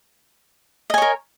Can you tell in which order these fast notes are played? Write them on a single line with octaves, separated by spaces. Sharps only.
D#5 G#5 C#5 A#4